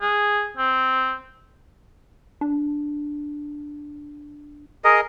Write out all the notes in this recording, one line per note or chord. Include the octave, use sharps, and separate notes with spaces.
G#4
C4
D4
G#4 A#4 D#5